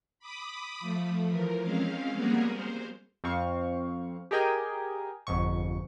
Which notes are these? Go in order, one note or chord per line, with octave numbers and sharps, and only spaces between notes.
B5 D6 D#6
F3 A3
E3 F3 A#4
G#3 C4 C#4 F5
G3 A#3 B3 F#4 G#4 A#4
C5
F2 C4 F5 C#6
G4 G#4 A#4 D#5 G5 G#5
G1 F2 G#2 C#6